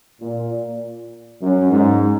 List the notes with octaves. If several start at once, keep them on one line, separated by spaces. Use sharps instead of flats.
A#2
F#2
G#2